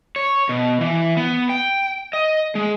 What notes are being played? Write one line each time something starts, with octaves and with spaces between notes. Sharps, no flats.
C#5
B2
E3
B3
G5
D#5
G#3